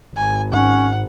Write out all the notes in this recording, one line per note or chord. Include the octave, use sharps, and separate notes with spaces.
G#1 G#5
G#2 C#4 F#5